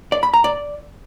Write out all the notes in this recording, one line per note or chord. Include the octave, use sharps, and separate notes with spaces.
D5
B5
A#5
D5